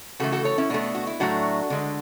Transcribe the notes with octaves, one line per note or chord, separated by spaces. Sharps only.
C#3 E3 A3 F#4 A4
F#4 A4
A4 C#5
C#4 E4
B2 A3 B3 D4
F#4
E4
A2 F#3 A3 D4 F#4
D3 G#3